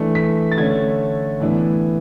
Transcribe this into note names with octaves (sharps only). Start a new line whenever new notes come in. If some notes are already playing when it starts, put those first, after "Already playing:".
Already playing: E3 A3 D4
B6
A6
D3 A3 C#4 G#6
A2 E3 B3 D4